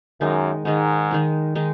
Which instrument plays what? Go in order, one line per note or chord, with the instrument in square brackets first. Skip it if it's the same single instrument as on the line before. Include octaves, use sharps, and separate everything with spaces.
[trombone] F#2 [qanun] D#3 G#3 D#4
[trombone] G#2 [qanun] D#3 G#3 D#4
[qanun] D#3 G#3 D#4
D#3 G#3 D#4